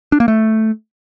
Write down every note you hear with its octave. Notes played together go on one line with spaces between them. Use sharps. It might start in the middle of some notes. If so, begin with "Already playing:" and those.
D4
A#3
A3